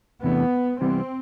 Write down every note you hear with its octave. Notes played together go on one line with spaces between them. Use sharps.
E2 C3 E3 A3 B3 D4
C2 C3 E3 G3 B3 C4